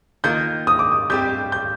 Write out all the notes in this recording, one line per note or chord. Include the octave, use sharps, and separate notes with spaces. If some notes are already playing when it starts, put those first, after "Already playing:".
D#3 A#3 F4 A#4 G6
D#6
D6
D#6
G3 C4 G4 G6
G6